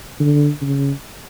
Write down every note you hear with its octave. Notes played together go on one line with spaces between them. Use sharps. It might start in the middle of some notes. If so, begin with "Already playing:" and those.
D3
C#3